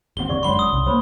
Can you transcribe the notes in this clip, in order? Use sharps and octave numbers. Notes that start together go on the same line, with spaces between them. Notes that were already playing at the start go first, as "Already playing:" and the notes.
G#1 C3 C4 F#4 F#5 G7
F2 D3 C4 G4 D5 C#6
G1 F#2 G#3 C#5 F#5 B5 C6 G7
D#6
C2 C#3
G3 A#3 C5 C#5 B5